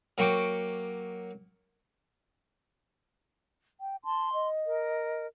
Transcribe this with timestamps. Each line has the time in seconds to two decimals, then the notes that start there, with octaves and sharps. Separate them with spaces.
0.18 F#3 A#3 G5 C#6 D6
3.81 G5
4.05 A5 C6
4.33 D#5
4.67 A#4